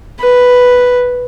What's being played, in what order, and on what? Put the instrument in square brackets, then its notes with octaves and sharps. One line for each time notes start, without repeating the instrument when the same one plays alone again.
[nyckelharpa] B4